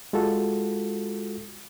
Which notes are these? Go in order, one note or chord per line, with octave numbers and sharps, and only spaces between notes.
G#3 F4 F#4 A4